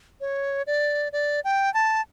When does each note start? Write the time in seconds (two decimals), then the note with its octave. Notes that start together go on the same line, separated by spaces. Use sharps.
0.21 C#5
0.67 D5
1.12 D5
1.44 G5
1.74 A5